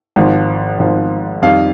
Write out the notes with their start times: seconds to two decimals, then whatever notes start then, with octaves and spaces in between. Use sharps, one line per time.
0.16 G#1 G#2 F3
0.79 G#1 G#2 F3
1.42 F2 D#3 G3 F5